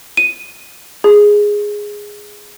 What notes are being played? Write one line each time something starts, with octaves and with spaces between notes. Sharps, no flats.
D#7
G#4